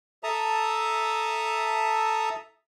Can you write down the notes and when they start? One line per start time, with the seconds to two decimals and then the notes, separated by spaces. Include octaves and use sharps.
0.24 A4 E5 A5 A#5 D#6